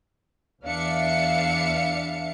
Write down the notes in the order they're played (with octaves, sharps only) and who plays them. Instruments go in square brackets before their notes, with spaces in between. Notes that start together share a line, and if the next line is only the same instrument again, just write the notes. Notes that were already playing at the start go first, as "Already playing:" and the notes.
[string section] E2 D4 E5 F5 C#7